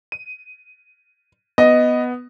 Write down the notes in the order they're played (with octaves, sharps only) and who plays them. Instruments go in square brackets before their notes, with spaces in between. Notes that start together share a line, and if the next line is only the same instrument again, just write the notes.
[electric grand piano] D#7
[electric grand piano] B3 [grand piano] D#5